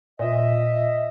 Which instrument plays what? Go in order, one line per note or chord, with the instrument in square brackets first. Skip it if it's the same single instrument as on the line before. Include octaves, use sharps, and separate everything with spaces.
[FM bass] A#2 [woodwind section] D#5 E5